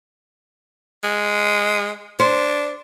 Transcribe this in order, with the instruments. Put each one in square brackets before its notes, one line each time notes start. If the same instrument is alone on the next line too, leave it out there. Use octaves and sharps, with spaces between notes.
[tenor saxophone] G#3
[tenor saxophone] D4 [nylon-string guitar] C5